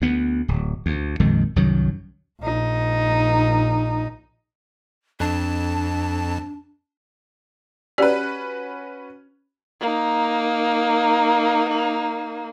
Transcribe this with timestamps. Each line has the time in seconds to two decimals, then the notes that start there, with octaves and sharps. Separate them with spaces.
0.02 D2 B3
0.48 D1
0.86 D2
1.20 A#1 F2 D#3 G#3
1.56 C2 F#2 D#3 F#3
2.41 A#1 D#4
5.20 F2 D4 A5
7.98 C#4 F#4 G4 B4 D5
9.80 A#3 D#4